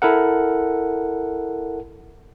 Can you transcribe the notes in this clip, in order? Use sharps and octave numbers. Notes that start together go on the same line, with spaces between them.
E4 A4 A#4 F#5